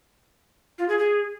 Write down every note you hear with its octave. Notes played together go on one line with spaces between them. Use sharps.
F4
G#4
G#4